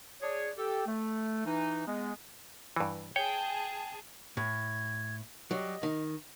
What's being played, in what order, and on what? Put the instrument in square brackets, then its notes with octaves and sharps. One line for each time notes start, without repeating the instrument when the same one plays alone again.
[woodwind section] D4 G#4 C#5
G4 A4
A3
E3 D#4
G#3 B3
[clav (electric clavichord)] G2 E3
[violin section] G#4 A5 [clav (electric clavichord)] C#5 [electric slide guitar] G5
[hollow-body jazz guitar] A2 [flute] G#6
[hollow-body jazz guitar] F#3 G3 [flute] D#5
[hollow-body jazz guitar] D#3